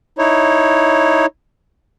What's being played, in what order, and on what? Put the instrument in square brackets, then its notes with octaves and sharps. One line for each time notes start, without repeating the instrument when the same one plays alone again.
[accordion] D#4 E4 C#5